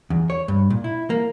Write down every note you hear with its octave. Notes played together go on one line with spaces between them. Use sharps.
E2
C#5
G2
A#2
E4
A#3